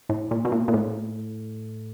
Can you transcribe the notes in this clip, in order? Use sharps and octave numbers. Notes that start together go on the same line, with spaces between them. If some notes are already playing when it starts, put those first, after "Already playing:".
A2
A#2
B2
A#2
A#2
A2